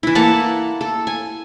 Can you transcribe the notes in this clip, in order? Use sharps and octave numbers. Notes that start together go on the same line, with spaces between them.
E3 E4
A#3 A4 F#5 A5
A4
G#5